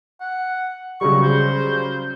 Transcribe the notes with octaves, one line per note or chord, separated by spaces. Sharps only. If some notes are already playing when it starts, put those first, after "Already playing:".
F#5
C#3 F#3 G3 C#6
C5